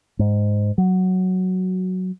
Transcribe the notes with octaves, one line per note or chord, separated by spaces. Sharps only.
G#2
F#3